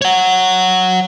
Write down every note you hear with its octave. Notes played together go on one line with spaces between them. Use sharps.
C#5 F#5